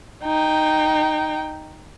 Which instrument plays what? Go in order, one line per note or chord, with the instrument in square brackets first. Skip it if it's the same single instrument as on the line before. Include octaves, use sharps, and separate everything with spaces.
[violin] D#4 G5